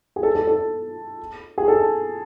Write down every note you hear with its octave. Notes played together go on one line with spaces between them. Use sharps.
G#4
A4
A4
A4
G#4
A4